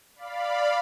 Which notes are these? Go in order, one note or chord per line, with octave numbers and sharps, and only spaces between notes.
D5 F5 B5